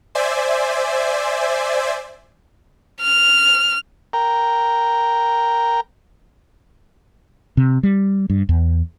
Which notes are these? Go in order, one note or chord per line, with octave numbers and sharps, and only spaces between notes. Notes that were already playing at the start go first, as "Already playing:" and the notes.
C5 D5 E5 G#5
F6
A#4 G5 A#5
C3
G3
G2
E2